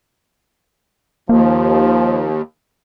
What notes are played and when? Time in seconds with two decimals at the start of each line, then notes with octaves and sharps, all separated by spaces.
1.29 D#2 F3 A#3